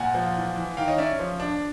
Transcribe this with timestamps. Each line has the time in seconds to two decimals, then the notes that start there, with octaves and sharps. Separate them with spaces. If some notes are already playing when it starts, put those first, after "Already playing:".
Already playing: A#2 F#5 G#5
0.15 F3
0.36 E3
0.56 E3
0.77 D#3 F5 G5
0.88 C#5 D#5
0.98 C#4 D5 E5
1.19 F3
1.40 D4